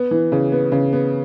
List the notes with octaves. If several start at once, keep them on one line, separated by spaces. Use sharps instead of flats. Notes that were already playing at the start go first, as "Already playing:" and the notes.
Already playing: B3
E3
C#3
B3
C#3
B3